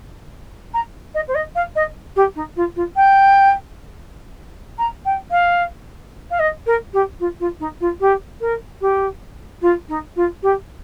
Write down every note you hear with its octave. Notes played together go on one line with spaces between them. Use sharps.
A#5
D#5
C5
D#5
F5
D#5
G4
D#4
F4
F4
G5
A#5
G5
F5
F5
D#5
A#4
G4
F4
F4
D#4
F4
G4
A#4
G4
F4
D#4
F4
G4